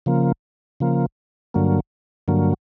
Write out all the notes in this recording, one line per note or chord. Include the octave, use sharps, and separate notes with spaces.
C#3 F3 A#3
C#3 F3 A#3
G2 D3 F#3 A#3
G2 D3 F#3 A#3